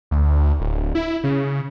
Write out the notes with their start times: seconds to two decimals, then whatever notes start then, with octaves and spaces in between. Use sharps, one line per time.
0.11 D2
0.60 D1
0.95 E4
1.24 C#3